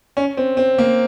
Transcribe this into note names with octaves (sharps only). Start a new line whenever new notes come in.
C#4
C4
C4
A#3